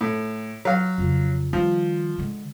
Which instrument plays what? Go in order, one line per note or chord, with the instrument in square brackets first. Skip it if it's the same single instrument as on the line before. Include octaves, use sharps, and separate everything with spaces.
[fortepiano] A2
F#3 F5
[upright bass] F2 C#3
[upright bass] D#3 G3 [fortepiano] F3
[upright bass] D3 G#3